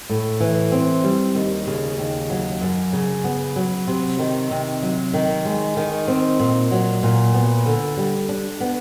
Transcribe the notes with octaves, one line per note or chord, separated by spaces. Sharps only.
A2
E3
C4
G3
D#2
C#3
D#2
F#3
F#2
C#3
B3
F#3
C3
D#3
C3
F#3
D#3
G#3
D#3
C4
A#2
F#3
A#2
B3
D3
G3
D4
B3